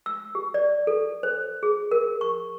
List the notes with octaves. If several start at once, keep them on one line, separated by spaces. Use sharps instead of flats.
E6
G4
D5
A4
C5
G#4
A#4
C#6